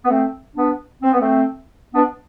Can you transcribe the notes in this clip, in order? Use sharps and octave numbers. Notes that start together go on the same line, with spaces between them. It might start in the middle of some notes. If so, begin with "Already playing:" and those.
B3
A3 C4
B3 D4
C4
B3
A3 C4
B3 D4